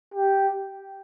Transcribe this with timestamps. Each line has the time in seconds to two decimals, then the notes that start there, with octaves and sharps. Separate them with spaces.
0.14 G4